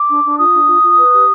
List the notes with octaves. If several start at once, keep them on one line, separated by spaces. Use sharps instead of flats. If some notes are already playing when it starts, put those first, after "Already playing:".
Already playing: D6
D4
D4
F4 D#6
D4
F4
F4
B4
G4